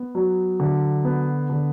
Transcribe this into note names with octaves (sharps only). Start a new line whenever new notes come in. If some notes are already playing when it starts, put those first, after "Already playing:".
Already playing: B3
F#3
D3
B3
D3